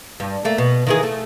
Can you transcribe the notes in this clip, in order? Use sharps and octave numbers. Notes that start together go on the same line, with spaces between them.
G2
A3 A#3
B2
D#3 E3 G#4
A3